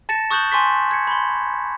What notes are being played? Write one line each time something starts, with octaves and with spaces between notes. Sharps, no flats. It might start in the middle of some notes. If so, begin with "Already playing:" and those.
A5 A6 A#6 C#7 E7
C#6 D#6 F#6 G6 E7 F#7
G#5 C6 C#6 B6
G#6 C#7
B5 C6